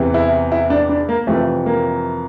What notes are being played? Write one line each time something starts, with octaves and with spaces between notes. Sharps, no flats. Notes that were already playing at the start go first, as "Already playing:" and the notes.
Already playing: E2 C3 E3
E4
E4
D4
D4
A#3
F2 C3 E3 A3
A#3